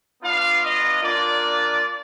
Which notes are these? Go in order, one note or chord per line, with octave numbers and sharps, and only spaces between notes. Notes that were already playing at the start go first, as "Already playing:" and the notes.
B3 D4 F4 F5
D#5
A#3 D4 F4 D5